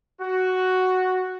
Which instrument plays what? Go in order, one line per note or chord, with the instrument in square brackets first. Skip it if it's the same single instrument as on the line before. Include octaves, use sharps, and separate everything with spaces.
[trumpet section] F#4